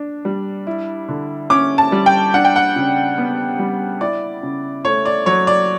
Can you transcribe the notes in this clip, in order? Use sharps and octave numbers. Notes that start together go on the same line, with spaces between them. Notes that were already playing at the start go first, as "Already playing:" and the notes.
Already playing: D4
G3
E4
D3
C#4 D6
A5
G3
G5
D4 F#5
G5
F#5
C#3
B3
G3
E4 D5
C#3
A3 C#5
D5
F#3 C#5
D5